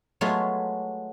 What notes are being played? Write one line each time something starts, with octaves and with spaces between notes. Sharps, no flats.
F#3 G#3 A3 B3 F4 F#4